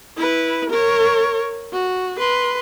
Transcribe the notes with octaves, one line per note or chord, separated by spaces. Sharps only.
E4 B4
A#4 C#5
F#4
B4 C6